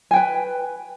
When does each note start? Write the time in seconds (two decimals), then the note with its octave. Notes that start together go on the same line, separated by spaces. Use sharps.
0.11 G#5
0.13 G5
0.16 B4